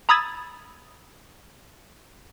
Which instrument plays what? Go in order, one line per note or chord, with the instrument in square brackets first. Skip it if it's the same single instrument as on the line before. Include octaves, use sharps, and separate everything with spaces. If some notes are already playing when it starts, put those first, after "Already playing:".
[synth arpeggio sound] A#5 B5 D#6 E6 G#6 A6